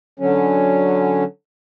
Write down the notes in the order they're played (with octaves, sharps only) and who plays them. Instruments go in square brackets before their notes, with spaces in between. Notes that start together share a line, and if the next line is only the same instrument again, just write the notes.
[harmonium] D3 F#3 C#4